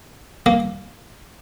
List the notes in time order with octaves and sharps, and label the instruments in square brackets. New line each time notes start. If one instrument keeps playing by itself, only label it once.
[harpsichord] A#3